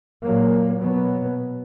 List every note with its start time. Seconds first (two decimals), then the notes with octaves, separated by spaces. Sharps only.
0.24 A#2 F#3 A#3
0.81 B2 F#3 B3